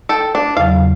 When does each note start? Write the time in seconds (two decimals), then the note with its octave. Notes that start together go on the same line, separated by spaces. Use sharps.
0.09 A4 G5
0.35 D4
0.57 E2 C#3 F#3 F5